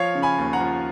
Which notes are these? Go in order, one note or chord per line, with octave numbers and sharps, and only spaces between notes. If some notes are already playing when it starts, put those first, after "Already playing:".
Already playing: F3 C#5 F5
C#3
G#5 B5
D#2
F#5 A#5
F3